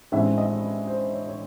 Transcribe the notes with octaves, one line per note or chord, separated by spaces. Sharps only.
A1 G2 E3 G#3 C4 E5
D#5
C5
C#5
C#5